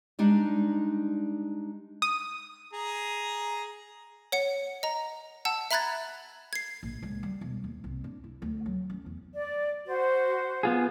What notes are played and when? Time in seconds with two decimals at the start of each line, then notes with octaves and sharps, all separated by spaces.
0.19 G3 G#3 D4 D#4
2.02 D#6
2.73 G#4 A#5
4.32 C#5 F#5 C#7
4.83 D#5 A#5
5.45 F#5 A5 E6
5.71 E5 A#5 B5 F#6 G#6 A6
6.53 G#6 C7
6.83 A#1
7.02 C#2
7.23 G3
7.41 E1
7.64 D#2
7.84 C2
8.04 D4
8.24 E4
8.42 D2
8.66 F#3
8.90 C#4
9.06 E2
9.35 D5
9.86 F#4 C5
10.63 B3 F4 G#4